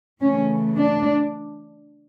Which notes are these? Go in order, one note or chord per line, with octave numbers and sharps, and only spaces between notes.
C#3 E3 A3 C#4
D4